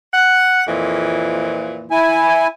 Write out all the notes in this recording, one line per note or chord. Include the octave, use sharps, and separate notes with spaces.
F#5
F2 A#2 E3
E4 G#5